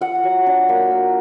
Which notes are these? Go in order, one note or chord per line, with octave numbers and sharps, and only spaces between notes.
F4 F#5
F#3
D4
A#3
F4